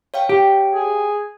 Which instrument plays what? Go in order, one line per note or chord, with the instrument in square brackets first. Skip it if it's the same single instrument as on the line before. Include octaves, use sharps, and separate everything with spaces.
[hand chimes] C#5 F5 G5
[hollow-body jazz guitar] G4
[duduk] G#4